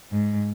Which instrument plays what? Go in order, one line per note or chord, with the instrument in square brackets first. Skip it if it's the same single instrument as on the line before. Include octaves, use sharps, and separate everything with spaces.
[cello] G#2